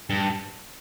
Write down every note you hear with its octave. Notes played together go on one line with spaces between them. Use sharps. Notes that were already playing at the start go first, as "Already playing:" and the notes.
G2